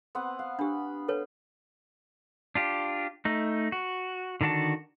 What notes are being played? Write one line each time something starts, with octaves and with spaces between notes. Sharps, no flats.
B3 C4 F#5
F5
D4 G4 B5
A4 B4 C#5
D4 F4 G4
A3 D#4
F#4
D3 D#3 D4 F#4 A5